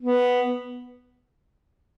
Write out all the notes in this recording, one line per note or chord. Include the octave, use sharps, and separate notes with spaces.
B3